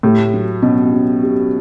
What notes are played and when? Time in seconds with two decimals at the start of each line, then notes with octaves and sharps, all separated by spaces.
0.03 A2 G4
0.34 F#3
0.62 B2 C#4
0.93 F#3
1.22 G4